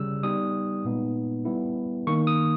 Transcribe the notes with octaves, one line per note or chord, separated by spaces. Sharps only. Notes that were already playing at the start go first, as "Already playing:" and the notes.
Already playing: C#3 G3 E6
G3 B3 D#4 D#6
A#2 G#3 B3 D#4
G3 B3 E4
D#3 A#3 D#4 C#6
D#6